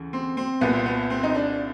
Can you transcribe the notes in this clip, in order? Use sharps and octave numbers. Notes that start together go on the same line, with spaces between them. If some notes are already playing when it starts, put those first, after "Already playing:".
Already playing: D2 C#3 E3
C4
C4
C2 A#2 B3
C4
B3
C4
D#4
D4